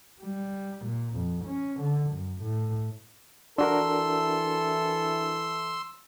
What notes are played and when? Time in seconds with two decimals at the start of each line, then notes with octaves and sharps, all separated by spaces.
0.21 G3
0.85 A#2
1.15 F2
1.46 C#4
1.80 D3
2.10 F#2
2.42 A2
3.58 E3 D4 E4 F#4 A4 A#4 C6 E6